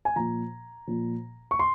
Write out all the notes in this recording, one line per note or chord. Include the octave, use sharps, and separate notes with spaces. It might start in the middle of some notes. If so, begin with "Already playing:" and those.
G#5
A#2 F3 A#5
A#2 F3
C#6
C6